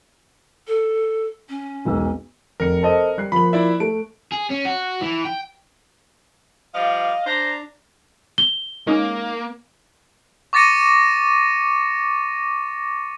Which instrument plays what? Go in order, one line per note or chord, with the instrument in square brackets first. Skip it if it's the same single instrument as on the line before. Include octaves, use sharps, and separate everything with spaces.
[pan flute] A4
C#4
[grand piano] E1 B1 E6
[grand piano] F1 C#7 [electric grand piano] A#4
[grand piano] A4 C5 D#5
G3 F#6 C7
[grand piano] F3 A#3 F#7 [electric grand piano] B5
[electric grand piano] E4 D5 E5
[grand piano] A3 [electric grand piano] D7
[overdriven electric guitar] G#4
C#4
F#4
E3
G5
[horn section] F3 G3 [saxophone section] D#5 F5
[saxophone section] D4 [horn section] C5 A#5
[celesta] G7
[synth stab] G#3 C#4 D#4 [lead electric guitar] A#3
[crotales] C#6 D6 A6 A#6 C#7 D#7